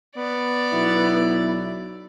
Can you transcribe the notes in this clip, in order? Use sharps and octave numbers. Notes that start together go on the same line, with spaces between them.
B3 D5
B1 E4